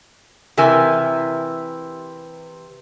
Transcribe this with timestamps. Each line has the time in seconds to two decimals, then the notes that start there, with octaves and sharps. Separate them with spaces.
0.57 C3 E3 A#4 E5 G#5